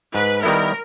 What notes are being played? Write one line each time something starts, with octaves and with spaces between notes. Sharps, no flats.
G#2 B4
D#3 G3 B3 E4 A#4